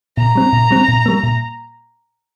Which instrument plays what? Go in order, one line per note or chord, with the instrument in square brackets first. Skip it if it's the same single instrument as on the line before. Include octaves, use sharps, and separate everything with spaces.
[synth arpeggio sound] A#2 [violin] A#5
[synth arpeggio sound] G3 C4
A#2
G3 C4
A#2
G3 A#3
A#2